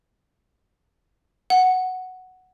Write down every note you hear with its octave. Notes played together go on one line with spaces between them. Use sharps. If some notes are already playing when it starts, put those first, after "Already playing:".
F#5